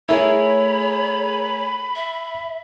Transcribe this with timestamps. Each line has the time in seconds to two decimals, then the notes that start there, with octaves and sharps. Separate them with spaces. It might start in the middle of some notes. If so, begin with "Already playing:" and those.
0.09 A3 E4 G#4 A#4 C#5 B5
1.95 E5